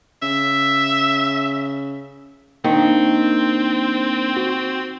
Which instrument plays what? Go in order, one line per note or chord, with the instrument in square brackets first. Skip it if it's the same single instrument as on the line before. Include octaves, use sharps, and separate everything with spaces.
[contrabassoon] C#3 [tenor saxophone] E5
[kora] D#3 [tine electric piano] A#3 D4 [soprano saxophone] C4
[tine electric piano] F#4